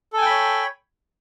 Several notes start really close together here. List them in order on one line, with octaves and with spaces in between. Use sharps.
A4 G#5 G5 B5 C#5